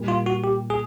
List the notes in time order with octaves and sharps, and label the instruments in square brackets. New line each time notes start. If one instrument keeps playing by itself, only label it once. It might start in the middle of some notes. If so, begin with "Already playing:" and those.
Already playing: [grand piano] A#2 G3 A#3
[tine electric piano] F4
F#4
G4
G#4